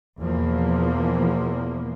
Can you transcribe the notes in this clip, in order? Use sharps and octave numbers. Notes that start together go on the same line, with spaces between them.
E2 B2 E3 F3 A#3